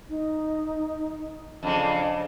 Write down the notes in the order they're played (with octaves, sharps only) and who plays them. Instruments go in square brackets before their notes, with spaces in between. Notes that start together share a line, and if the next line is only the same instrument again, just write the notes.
[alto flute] D#4
[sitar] F2 C#3 [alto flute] D4